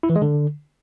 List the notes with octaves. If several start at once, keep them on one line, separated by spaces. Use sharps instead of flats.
E4
E3
G#3
D3